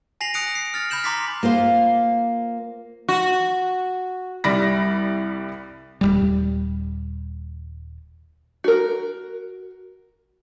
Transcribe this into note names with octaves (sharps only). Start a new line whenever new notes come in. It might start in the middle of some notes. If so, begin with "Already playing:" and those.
G#5 A#6 C7 F7 F#7
D#6 F#6 A#6 C#7 D7 F7
C7
F6 A6 F7
B5 F6 G6 E7 F#7
A#5 C6 D6 A6 B6 F#7
A#3 F4 C5 F5
F#4
C2 G3 D5 B5 A#6
D#1 A#1 G3
F#4 A#4